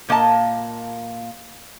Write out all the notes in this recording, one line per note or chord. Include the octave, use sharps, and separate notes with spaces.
A#2 A#3 D#5 A5 A#5